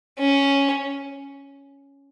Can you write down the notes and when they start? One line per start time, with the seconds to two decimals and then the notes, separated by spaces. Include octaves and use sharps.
0.19 C#4